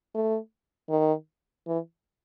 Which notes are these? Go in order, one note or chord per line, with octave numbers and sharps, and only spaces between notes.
A3
D#3
E3